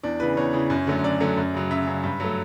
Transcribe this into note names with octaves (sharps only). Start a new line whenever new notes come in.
E2 D4
C#3 E3 B4
E2 C#5
C#3 E3
F#2
D3 F#3 A3
F#2 D5
D3 F#3 A3
F#2
C#3 F#3
F#2 E5
C#3 F#3
G2
F#3 A3